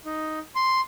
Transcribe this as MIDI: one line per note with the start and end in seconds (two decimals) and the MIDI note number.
0.05 0.39 63
0.55 0.81 84